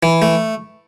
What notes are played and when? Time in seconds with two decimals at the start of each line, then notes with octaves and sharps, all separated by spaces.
0.03 E3
0.22 A3